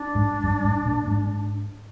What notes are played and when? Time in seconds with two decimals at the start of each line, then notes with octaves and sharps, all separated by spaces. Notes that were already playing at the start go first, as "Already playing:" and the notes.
Already playing: D4
0.15 G#2 G#3
0.44 G2 G3
0.64 G#2 G#3
0.86 A#2 A#3
1.07 G#2 G#3